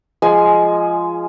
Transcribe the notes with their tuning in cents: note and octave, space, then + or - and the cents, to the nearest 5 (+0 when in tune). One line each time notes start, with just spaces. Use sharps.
F3 -10 G#3 +0 G#5 +20